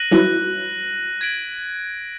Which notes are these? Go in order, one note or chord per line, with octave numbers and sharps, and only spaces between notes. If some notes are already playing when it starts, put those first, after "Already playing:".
Already playing: F#6 A#6 D#7 F#7
E3 F#3
G#6 B6 D7 F#7